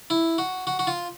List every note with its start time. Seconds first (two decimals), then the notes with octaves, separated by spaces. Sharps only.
0.10 E4
0.38 F#4
0.67 F#4
0.79 F#4
0.87 F4